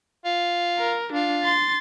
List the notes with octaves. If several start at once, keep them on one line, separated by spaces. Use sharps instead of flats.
F4
A#4
D4 F4
C6 A6